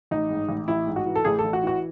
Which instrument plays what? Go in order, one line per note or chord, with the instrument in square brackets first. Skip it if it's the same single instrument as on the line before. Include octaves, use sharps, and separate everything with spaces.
[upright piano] A1 D#4
G#2
A1
A1 E4
G#2
F#4
E3
A4
A1 G#4
A4
A1
F#4
E3 F#4